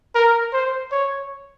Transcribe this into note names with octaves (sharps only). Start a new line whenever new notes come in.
A#4
C5
C#5